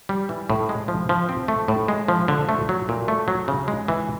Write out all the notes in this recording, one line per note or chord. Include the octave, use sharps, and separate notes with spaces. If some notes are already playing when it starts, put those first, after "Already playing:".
G3
E3
A2
G#3
F3
F3
C4
A3
A2
G#3
F3
D3
A3
F#3
A#2
A3
F#3
C#3
G#3
E3